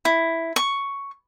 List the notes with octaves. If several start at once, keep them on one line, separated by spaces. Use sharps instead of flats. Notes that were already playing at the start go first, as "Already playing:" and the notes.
E4
C#6